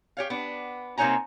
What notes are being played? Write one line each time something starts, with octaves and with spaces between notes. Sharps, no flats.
G4 C#5 F5
B3 D4
C3 A#3 D#4 C#5 G#5 A#5